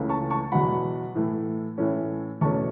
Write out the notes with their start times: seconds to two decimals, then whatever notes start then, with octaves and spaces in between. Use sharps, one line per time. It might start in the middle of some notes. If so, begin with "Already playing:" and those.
Already playing: C#2 C#3 E3 A3 C#4
0.09 A5 C#6
0.30 A5 C#6
0.52 E2 B2 F#3 F#5 B5
1.15 A2 E3 A3
1.78 A2 E3 A3 C#4
2.41 E2 B2 A3 C#4 A5 C#6